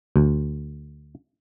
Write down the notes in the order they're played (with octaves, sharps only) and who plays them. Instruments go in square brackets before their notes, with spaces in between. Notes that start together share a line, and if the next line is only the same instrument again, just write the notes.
[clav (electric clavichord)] D2